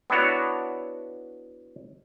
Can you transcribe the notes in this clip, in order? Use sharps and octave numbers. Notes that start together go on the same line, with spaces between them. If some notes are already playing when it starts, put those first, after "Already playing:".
B3 D4 E4 F#4 C#5